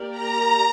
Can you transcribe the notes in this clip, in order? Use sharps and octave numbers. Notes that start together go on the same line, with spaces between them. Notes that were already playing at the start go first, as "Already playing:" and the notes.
Already playing: A#3 G4 A#4 D5
A#5